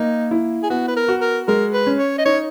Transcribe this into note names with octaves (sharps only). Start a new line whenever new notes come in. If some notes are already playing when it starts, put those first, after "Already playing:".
Already playing: A#3 D#4
E4
G#4
B3 F#4
B4
A#4
F#4
A#4
G#3 A#4
B4
C#4
C#5
D#5
D#4 C#5